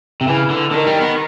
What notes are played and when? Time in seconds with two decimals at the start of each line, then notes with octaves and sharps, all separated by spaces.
0.21 C3
0.27 C#3 E3
0.50 D3
0.71 D3 D#3
0.87 G3
1.01 B3